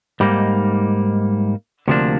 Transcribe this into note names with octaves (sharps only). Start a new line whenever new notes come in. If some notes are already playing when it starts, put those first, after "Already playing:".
G#2 G3 A#3 D#4
D2 C3 F3 A#3 D4